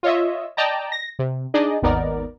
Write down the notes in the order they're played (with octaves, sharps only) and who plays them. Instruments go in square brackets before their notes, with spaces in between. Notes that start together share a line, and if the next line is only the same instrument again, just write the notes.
[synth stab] F4 C#5 D#5 E5
D5 D#5 G5 A5 A#5
A#6
C3
D4 D#4 G#4 D5 D#5
G#1 D#2 B3 D#4 A#4 D5